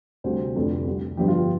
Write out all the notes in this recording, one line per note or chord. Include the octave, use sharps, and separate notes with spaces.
D2 C3 G3 C5
F1 F2 D3 A4
C2 C3 G3
G1 G2 F3 G4
F4
G4